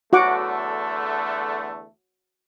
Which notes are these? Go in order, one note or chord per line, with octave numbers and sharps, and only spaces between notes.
E2 D3 A3 F#4 F#5 D6